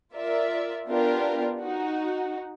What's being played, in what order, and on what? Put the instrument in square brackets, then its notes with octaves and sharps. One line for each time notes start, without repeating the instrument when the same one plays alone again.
[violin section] F4 A#4 D5 E5
B3 D4 F4 G4 A#4
D#4 F#4